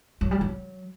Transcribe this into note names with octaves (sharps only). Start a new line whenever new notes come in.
F#3
G3
F#3